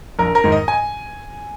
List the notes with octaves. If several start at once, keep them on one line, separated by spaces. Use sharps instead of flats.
A#1 A#4
A#4
G#2 D#3
D#5
G#5